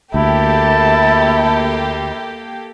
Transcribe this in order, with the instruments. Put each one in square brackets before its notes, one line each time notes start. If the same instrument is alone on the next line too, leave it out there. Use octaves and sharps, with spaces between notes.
[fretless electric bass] D2 [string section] A#3 G4 A4 [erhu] E4 [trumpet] A5